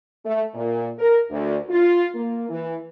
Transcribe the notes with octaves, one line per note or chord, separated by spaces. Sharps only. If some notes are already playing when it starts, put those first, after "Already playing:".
A3
A#2
A#4
D2
F4
A#3
E3